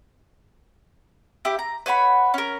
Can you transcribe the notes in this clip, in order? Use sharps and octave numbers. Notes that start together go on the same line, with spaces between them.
E4 G4
A#5
B4 C#5 F#5 B5
C#4 A#4